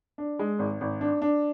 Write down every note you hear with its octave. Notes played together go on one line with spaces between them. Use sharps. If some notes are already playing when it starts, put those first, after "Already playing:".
D4
G#3
G#1
G#1
D4
D4